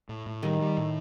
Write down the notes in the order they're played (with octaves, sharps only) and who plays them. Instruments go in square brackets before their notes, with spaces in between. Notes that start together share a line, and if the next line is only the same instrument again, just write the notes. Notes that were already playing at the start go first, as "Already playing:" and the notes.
[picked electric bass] A2
A2
[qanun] D#3 [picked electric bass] G3
[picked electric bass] G3
A2